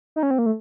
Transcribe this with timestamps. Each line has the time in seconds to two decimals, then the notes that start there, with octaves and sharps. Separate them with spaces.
0.16 D#4
0.23 C#4
0.31 C4
0.38 A#3
0.46 A3